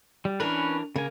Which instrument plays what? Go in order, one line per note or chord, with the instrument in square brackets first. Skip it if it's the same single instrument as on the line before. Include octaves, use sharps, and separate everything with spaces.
[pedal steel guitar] G3
[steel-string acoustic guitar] E3 D4 A#4 [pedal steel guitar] C#4 B4
[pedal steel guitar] C#3 G#5 [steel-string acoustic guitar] A#3